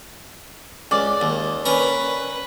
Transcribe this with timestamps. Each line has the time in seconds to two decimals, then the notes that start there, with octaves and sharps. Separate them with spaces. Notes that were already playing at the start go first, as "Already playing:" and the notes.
0.91 C#2 D5
1.21 D#2
1.66 C#4 A#4 B4